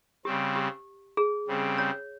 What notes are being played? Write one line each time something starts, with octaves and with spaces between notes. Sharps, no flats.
C#3 G3 C4 G4
G4
G#4
C#3 G3 C4
C#5